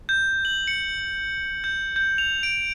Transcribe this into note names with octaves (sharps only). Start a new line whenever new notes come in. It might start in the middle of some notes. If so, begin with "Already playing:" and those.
G6
F#7
C#7
G6
G6
F7
D7